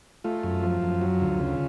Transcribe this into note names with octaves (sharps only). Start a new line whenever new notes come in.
A3 F4
F#2
F3
F#2
F#3
D2
C#3